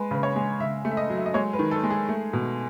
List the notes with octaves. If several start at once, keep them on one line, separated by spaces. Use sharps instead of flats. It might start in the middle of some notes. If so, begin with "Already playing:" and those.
Already playing: G#3 B4
C#3 B4
C#5
G#3
C#3 E5
A3
E5
D#5
F#3
E5
D#5
G#3 C#5
B4
D#3
A4
G#3
G#4
A3
B2